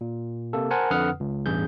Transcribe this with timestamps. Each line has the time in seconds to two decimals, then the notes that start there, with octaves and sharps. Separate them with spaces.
0.01 A#2
0.53 C3 A#3 A4
0.71 A#4 C5 F#5 G#5 A5
0.91 F2 D3 B4 F#5 D#6 F6
1.20 C#2
1.46 A1 E2 G2 G#4 G6